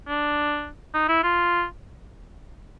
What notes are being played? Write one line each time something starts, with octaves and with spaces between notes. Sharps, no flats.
D4
D#4
E4
F4